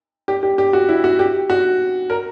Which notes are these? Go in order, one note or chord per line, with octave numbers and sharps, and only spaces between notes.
G4
G4
G4
F#4
E4
F#4
G4
F#4
A#4